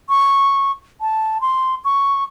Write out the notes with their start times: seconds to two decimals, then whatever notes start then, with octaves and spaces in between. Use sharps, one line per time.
0.09 C#6
1.01 A5
1.41 C6
1.85 C#6